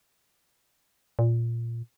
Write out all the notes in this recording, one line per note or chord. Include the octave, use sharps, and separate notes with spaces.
A#2